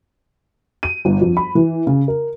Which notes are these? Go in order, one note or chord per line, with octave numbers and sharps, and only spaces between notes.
D#7
G1
F2
B5
E3
C#3
A#4